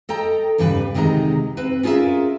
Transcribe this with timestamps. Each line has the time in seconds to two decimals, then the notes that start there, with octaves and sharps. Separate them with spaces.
0.09 A4 D#5 G5 A#5
0.58 E2 G2 C#3 G3 G4 B4
0.94 D2 C3 D#3 G#3 D#5 A#5
1.57 C4 B4
1.83 C#4 F4 G#4 A#4 E5